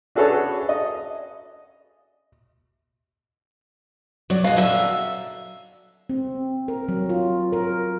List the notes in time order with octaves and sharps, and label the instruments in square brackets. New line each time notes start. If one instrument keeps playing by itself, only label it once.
[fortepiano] D4 F#4 G#4 A4 B4 C#5
D#5
[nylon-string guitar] F#3 [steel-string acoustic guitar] D5
[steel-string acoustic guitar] B2 G#3 [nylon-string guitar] F5
[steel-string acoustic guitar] F#2 D3 E5
[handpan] C4
A#4
F#3
F4
A#4